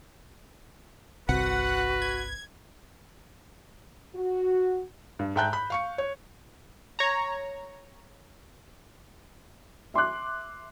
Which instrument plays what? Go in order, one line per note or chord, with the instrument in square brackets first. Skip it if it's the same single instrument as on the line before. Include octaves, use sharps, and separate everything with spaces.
[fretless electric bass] G1 C2 C3 [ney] F#4 [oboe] B4 [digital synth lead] F#5
[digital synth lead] G#6
[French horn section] F#4
[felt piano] G2
G#2 E5 G5 A5 F#6 G6
B5
F5 C#6 C#7
C#5
[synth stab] C#5 A#5
[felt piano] E5 C6 D6 F#6